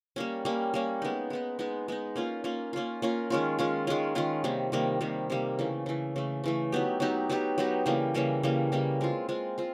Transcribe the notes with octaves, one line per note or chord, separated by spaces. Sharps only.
G3 A#3 C#4
G3 A#3 C#4
G3 A#3 C#4
G#3 B3 D#4
G#3 B3 D#4
G#3 B3 D#4
G#3 B3 D#4
A#3 C#4 F4
A#3 C#4 F4
A#3 C#4 F4
A#3 C#4 F4
D#3 G#3 C#4 F4
D#3 G#3 C#4 F4
D#3 G#3 C#4 F4
D#3 G#3 C#4 F4
C3 D#3 G3 A#3
C3 D#3 G3 A#3
C3 D#3 G3 A#3
C3 D#3 G3 A#3
C#3 E3 A3
C#3 E3 A3
C#3 E3 A3
C#3 E3 A3
F#3 B3 D#4 G4
F#3 B3 D#4 G4
F#3 B3 D#4 G4
F#3 B3 D#4 G4
C#3 E3 G3 A#3
C#3 E3 G3 A#3
C#3 E3 G3 A#3
C#3 E3 G3 A#3
G#3 C4 F4
G#3 C4 F4
C4 F4